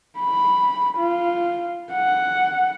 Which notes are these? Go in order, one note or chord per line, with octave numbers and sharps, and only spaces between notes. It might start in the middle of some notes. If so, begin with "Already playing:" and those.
B5
F4
F#5